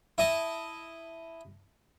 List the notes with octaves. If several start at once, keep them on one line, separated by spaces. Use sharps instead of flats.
E4 D#5 A5